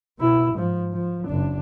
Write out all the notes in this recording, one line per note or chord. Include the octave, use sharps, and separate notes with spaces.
B2 E4
G#2 F3
F3
F#1 D4